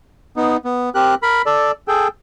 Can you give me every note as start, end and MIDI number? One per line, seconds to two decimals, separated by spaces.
0.36 0.57 59
0.36 0.57 63
0.65 0.90 59
0.95 1.15 60
0.95 1.15 67
0.95 1.15 70
0.95 1.15 90
1.22 1.42 70
1.22 1.42 83
1.46 1.72 69
1.46 1.72 74
1.88 2.08 68
1.88 2.08 69
1.88 2.08 79